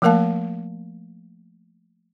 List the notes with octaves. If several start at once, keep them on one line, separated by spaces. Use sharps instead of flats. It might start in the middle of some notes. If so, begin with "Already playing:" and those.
F3 A3 A#3 A#4 F5 A5